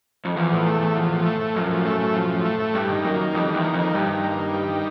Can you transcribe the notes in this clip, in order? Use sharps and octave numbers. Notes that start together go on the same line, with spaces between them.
F2
E2 F3
A2
A3
A2
F3
A2
A3
A2
F#2 F3
A2
A3
A2
F3
A2
A3
A2
G2 G3
D#3
F#2 A#3
D#3
F2 G3
D#3
E2
A#3
F2
D#3
G2 G3
D#3
A#3
D#3
G3
D#3